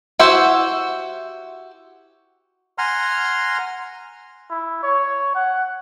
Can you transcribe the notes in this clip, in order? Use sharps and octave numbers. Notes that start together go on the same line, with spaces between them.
E4 F#4 G4 C5 E5
F#5 G#5 A#5 C6 F6
E4
C#5
F#5